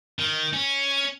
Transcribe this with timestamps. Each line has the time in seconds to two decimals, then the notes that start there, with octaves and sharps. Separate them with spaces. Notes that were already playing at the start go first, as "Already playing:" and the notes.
0.19 D#3
0.53 C#4